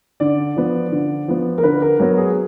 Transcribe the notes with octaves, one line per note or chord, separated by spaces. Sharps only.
D3 D5
F3 B3
D3
F3 B3
A#4
D3 B4
A#4
F#3 B3 A#4
G#4